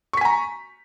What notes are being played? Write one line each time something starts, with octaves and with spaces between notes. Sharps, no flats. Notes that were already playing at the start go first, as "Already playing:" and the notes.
G#5 A#5 C#6 B6